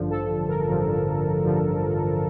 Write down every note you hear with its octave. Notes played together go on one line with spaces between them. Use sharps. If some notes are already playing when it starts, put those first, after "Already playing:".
Already playing: A1 G2 D3 F3
A4
A#4
A1 G2 D3 F3
A1 G2 D3 F3